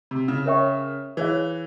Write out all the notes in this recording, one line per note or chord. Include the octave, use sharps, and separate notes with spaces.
C3
C#3
A#4 C#5 E5 G5 C#6
E3 G#4 C#5 F5